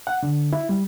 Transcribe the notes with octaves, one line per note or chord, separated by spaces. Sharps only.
F#5
D3
E4
G3